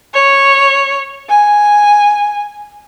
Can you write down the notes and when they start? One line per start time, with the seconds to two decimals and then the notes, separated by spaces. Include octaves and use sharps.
0.14 C#5
1.29 G#5